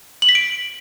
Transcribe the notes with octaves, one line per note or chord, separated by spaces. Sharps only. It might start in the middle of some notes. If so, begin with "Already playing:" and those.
F#7
B6
D7